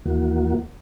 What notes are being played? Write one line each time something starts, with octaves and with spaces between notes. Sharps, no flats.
D#2 E3 A#3 F#4